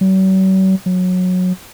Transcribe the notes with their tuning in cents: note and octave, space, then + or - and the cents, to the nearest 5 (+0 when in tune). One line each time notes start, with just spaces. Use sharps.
F#3 +45
F#3 -20